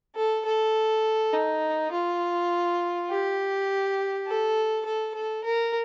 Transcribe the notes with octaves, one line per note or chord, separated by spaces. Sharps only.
A4
A4
D#4
F4
G4
A4
A4
A4
A#4